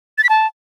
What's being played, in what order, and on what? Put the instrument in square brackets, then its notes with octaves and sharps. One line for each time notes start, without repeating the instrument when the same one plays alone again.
[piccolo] A6
B6
A5